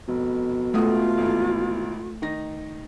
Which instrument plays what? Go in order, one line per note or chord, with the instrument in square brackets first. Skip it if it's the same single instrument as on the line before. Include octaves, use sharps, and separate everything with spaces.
[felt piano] F1 [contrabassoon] B2
[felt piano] C#2 F#4 D#6 [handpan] A3 [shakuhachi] F4
[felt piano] G#1 E3
D#3 D#4 A#6